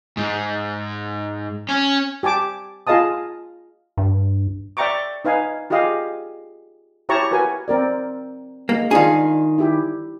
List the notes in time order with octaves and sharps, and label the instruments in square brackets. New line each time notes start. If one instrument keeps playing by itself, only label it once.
[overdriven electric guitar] G#2
C#4
[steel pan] G4 G#5 A5 D6
F4 G#4 D#5 F5 A5 D#6
[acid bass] G2
[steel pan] D5 E5 G5 A#5 C#6 D6
D#4 B4 F5 G#5
F4 G4 G#4 D#5 F5
E4 G4 C#5 A5 A#5 C#6
F#4 A#4 B4 G#5
C4 A#4 D5
[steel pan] G#3 [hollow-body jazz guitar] A#3
[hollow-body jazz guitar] D#3 G#4 [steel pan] D4 F4 F5
[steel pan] E4 G4